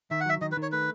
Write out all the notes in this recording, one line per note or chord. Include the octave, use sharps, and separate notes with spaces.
D#3 E5
F#5
F#3 E5
D#3 D#5
B4
D#3
C#5
A3 B4